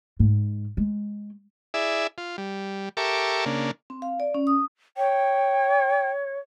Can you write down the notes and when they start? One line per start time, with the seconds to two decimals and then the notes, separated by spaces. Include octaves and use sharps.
0.20 G#2
0.77 G#3
1.74 E4 G#4 D5 E5
2.18 F4
2.38 G3
2.97 G4 A4 A#4 E5 C#6 D6
3.46 C#3 A#3 D4
3.90 C4
4.02 F5
4.20 D5
4.35 C#4
4.47 D#6
4.97 C#5 G5